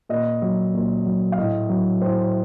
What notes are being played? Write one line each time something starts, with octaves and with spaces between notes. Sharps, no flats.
A#2 D#5
F#3
A#2
F#3
F5
A2 D#5
F#3
A2 C5